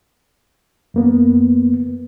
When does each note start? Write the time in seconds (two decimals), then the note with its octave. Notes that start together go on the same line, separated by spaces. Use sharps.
0.94 F#2 A#3 B3